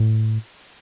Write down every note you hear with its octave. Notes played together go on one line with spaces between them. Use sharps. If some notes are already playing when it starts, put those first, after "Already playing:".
Already playing: A2